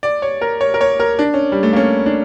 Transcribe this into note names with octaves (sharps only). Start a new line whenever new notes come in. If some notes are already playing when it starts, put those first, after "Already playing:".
D5
C#5
A#4
C#5
A#4
C#5
A#4
D4
C#4
G3
A3
A#3
C#4
D4